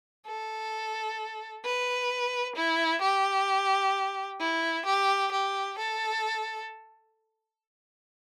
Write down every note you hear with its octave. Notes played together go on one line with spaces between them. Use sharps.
A4
B4
E4
G4
E4
G4
G4
A4